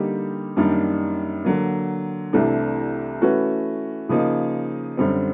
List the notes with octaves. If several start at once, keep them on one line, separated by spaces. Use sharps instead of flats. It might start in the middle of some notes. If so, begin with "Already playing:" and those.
Already playing: D3 G3 A#3 D#4 G4
F#2 D#3 G3 A#3 D4
D3 F#3 A#3
C2 C3 E3 A3 D4
E3 A3 C#4 F#4 B4
C#3 F3 A#3 D#4
F#2 D3 G3 C4